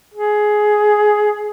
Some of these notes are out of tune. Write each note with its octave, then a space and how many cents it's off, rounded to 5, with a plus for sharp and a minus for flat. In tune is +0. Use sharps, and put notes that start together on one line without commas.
G#4 +15